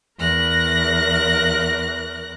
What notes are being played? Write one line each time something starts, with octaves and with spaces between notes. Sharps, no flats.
E2 A#4 F#6 A#6